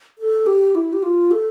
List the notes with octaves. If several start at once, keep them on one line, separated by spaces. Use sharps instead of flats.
A4
G4
E4
G4
F4
A4